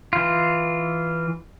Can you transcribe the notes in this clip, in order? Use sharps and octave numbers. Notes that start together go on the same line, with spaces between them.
E3 F4